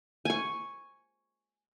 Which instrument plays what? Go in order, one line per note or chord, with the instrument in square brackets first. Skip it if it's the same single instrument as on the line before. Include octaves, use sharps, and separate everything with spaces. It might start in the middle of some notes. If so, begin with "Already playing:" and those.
[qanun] G#5 C#6